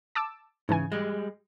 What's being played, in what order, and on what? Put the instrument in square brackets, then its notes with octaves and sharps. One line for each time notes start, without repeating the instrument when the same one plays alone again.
[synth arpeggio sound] A5 D6 E6
[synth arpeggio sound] G#2 E3 G#5 [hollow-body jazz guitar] C#3
[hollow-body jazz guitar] G3 G#3